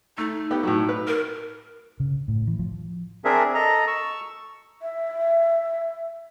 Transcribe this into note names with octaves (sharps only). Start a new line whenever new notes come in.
A3 D#4
B3 G4
A2 F#3
B4
A#4
C#3
A2
E3
F3
C4 D4 G#4 A#4 E5
A4 D#5 A#5
C#6 E6
E5